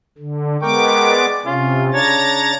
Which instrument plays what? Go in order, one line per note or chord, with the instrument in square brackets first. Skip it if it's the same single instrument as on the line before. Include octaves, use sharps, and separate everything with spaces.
[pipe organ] D3
[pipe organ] G#3 B3 D6 [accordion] A#4 G5 C#6
[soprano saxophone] D5
[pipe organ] C3 [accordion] C#4 [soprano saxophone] F4
[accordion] C#3 D4 [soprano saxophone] C#5 [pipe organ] A#5 A6